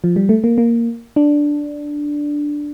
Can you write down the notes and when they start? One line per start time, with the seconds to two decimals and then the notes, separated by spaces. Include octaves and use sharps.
0.04 F3
0.16 G3
0.29 A3
0.44 A#3
0.58 A#3
1.16 D4